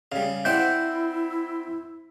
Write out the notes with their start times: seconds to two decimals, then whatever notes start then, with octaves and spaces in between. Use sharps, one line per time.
0.12 C#3 G3 G#4 F5
0.45 C4 E4 C5 D5 E5 F#5 G6